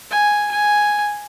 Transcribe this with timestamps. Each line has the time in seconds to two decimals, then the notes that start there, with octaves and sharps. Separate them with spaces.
0.11 G#5
0.51 G#5